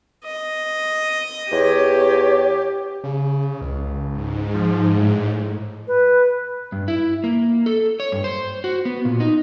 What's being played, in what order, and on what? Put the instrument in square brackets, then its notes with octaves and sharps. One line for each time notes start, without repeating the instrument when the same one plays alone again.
[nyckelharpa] D#5
[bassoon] E2 [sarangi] G4 [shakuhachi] C#5
[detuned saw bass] C#3
C#2
[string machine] G#2
[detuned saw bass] F3
A2
[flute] B4
[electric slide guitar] G2
E4
A#3
A4
C#5
G2
C5
F#4
B3
A#2
D#4